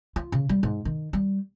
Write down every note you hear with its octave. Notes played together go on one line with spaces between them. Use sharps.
F4
C#3
G3
G#2
D#3
G3